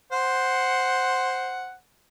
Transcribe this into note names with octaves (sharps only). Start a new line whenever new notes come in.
C5 F#5